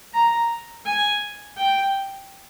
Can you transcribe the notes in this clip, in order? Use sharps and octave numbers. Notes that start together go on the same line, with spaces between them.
A#5
G#5
G5